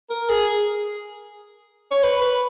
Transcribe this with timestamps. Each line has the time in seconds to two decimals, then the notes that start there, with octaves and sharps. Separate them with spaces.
0.10 A#4
0.30 G#4
1.91 C#5
2.03 B4
2.22 B4